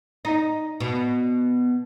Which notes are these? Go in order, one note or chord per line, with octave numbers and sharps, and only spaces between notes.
D#4
B2